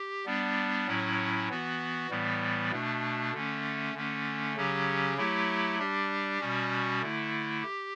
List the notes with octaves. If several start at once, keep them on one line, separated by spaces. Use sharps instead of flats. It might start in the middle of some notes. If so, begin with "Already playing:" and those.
Already playing: G4
G3 B3 D4
A2 F#3 C#4 E4
E3 B3 F#4
A2 E3 G3 B3
B2 A3 D4
D3 A3 C#4
D3 A3 C#4
C#3 F#3 C#4 G4
F#3 A3 E4 G4
G3 D4 G4
B2 G3 C#4 F#4
D3 A3 E4
G4